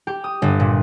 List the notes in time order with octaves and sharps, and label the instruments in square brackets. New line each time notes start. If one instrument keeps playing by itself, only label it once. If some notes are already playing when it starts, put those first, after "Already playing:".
[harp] G4
D#6
G1
A#2